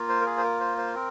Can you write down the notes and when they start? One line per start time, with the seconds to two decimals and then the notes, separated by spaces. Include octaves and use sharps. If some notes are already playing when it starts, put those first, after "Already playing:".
Already playing: A#3 F4
0.09 C5
0.21 A#4
0.26 G#4
0.37 C5
0.43 A#4
0.61 C5
0.78 C5
0.95 C4 A#4